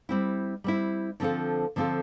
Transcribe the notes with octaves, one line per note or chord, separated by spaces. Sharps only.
G3 C4 E4
G3 C4 E4
D3 F3 C4 F4 A4
D3 F3 C4 F4 A4